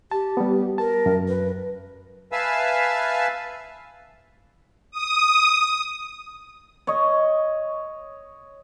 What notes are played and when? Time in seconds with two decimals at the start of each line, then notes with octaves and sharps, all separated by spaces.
0.11 G4 A5
0.37 G3 B3
0.78 A#4 A5
1.06 F#2
1.28 B4
2.32 B4 E5 F5 G#5 A5 E6
4.91 D#6
6.87 C#5 D#5